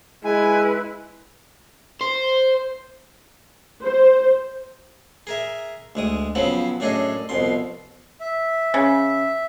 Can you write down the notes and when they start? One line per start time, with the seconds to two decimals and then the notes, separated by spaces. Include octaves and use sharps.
0.24 G#3 E4 B4 G#5
2.01 C5
3.82 C5
5.27 G#4 A#4 E5
5.95 D2 G#3 D#6
6.35 C#3 F3 F#3 B3 C4
6.80 F#2 A2 D4 G#4 A4 D#5
7.29 C2 F2 B2 C6
8.20 E5
8.74 C#3